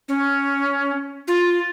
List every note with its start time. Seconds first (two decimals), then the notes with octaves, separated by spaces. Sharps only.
0.08 C#4
1.28 F4